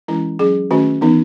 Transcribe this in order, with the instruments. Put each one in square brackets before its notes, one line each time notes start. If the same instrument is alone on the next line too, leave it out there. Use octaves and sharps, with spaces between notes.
[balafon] E3 G#3 C#4 E4
F#3 C#4 G#4
D#3 A3 C#4 F#4
E3 B3 D#4